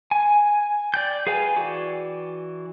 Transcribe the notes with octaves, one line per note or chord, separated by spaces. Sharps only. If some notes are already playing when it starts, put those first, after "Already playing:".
G#5
D5 G5 G6
G#4 B4 F5 G5 G#5
E3 F#4 D5